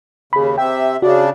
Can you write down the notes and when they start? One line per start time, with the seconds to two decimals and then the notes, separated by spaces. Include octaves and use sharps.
0.33 D#2 C#3 G#4 B5
0.58 C3 E5 G5
1.02 C#3 D4 F#4